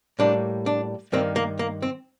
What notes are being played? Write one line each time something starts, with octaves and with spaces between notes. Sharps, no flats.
A2 G3 A#3 D4
D4
G2 D#3 A#3 C4
A#3
A#3
C4